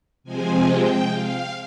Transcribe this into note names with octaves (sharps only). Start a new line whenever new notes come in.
C3 F3 G#3 C4 G#5
G5
F5